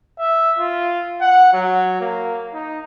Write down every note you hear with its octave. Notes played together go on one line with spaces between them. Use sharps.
E5
F4
F#5
F#3
A#3
D#4